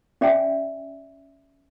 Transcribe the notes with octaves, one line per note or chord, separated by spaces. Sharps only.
C#4 D5 E5 G5 G#5